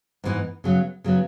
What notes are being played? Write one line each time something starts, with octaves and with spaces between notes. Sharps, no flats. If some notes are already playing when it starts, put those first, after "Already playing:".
G#2 E3 B3 D#4
C#3 F#3 B3
C#3 F#3 B3